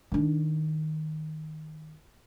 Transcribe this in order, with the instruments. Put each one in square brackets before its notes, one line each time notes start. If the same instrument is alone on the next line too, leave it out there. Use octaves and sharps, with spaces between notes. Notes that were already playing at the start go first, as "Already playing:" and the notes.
[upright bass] D#3 D4